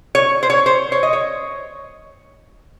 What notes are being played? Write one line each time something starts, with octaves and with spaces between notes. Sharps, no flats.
C#5
C5
C#5
C5
C#5
D#5
C#5